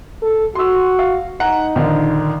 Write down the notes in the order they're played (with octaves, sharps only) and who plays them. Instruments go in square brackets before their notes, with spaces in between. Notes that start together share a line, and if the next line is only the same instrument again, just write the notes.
[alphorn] A4
[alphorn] F#4 [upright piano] C6 E6
[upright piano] F5
[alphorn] D#4 [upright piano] F#5 A#5
[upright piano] A#1 D3 D#3